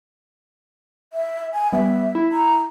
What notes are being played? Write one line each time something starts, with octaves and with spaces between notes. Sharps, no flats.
E5
G#5
G3 B3 E5
E4
A#5